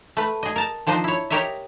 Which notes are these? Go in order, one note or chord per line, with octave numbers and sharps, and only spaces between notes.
A3 B4
G#4 D#5
A#4 A5
D#3 F3 D4 C5 D#5
E4 C#5
G4 A#4 C#5 D#5 E5